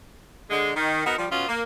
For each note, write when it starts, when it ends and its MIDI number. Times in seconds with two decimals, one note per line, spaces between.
0.50 0.70 50
0.50 0.70 56
0.75 1.03 51
1.05 1.18 59
1.05 1.18 63
1.05 1.18 66
1.05 1.18 70
1.18 1.25 53
1.18 1.25 55
1.30 1.46 47
1.30 1.46 59
1.30 1.46 61
1.30 1.46 65
1.48 1.62 58